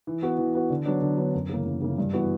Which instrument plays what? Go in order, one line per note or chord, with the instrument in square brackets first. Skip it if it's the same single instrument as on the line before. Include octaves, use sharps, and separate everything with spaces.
[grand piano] E3
B3 F#4
E3
B3 F#4
D3
F#3 B3 D4
D3
F#3 B3 D4
F#2
C#3 E3 A#3
F#2
C#3 E3 A#3
G2
E3 B3 F#4